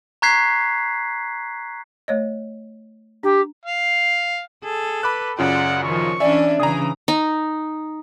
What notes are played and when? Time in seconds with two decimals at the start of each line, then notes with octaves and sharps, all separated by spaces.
0.22 A#5 C#6 F#6 G#6 B6 C7
2.08 A3 C#5 D#5
3.23 D4 G4
3.65 F5
4.64 G#4 A4
5.03 B4 B5 D6 F#6
5.39 F#2 C#3 F4 D5 F#5
5.83 D#3 F3 C#6
6.20 E3 C#4 D4 D5 E5 G#5
6.60 C#3 E3 G#4 A#5 D#6
7.08 D#4